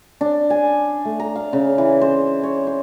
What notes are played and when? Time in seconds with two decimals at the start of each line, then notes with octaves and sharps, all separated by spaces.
0.21 D4
0.50 G#5
1.05 A3
1.20 A#5
1.36 F5
1.53 C#3
1.78 E3
2.01 C5
2.43 C#5
2.67 C5